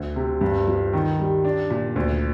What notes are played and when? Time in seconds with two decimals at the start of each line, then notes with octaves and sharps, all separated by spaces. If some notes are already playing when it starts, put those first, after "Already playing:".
Already playing: D2
0.16 C3
0.41 G2
0.67 F3
0.93 D#3
1.19 G3
1.45 D4
1.70 A#2
1.96 D2